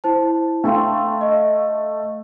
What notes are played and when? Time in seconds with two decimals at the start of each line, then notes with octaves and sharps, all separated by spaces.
0.04 E4 C5 A5
0.64 A3 D4 F5 G5 C6
1.21 D#5